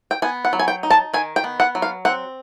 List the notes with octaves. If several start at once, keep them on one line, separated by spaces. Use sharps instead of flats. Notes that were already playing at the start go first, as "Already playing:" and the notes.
G5
B3 G#5
F#5
F#3
G#5
G5
D#4
A5
D#3 G#5
G5
B3
F#5
F#3
F5
C4 F#5